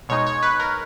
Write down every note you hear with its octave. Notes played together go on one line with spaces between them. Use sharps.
B2 G#3 D#4 C#5
C#5
B4
A#4